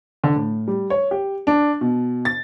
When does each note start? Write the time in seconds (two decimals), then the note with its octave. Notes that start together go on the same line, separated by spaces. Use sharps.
0.24 D3
0.36 A2
0.68 G3
0.90 C#5
1.11 G4
1.47 D4
1.81 B2
2.25 A6